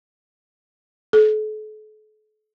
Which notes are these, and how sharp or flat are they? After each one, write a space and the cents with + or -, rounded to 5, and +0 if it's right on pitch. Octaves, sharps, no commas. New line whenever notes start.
A4 -40